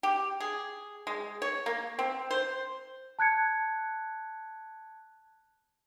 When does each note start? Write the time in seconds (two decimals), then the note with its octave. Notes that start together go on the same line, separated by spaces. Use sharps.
0.03 G4
0.40 G#4
1.07 G#3
1.42 C#5
1.66 A#3
1.99 C4
2.31 C5
3.19 A5 F#6 G#6 C#7